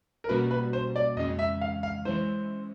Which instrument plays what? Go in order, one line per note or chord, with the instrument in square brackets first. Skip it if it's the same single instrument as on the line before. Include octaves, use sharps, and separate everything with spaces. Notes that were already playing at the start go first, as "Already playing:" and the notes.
[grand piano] A#4
[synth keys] B2 G3 A#3 C#4 F#4 [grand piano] B4
[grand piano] B4
C5
D5
[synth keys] F2 C#3 E3 G#3 C#4 [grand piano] D#5
[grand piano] E5
F5
F5
[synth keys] E3 G#3 C#4 E4 [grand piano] C5